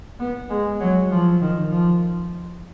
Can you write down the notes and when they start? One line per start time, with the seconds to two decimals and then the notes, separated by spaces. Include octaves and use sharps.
0.20 B3
0.50 G#3
0.80 F#3
1.11 F3
1.41 D#3
1.71 F3